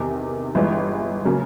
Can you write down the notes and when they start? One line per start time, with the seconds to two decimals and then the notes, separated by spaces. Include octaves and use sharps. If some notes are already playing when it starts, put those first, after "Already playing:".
Already playing: E2 C3 D#3
0.55 G1 G2 E3 G#3
1.25 C#3 F#3 A#3